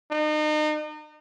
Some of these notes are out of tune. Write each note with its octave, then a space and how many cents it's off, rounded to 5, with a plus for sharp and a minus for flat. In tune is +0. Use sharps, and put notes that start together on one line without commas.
D#4 -35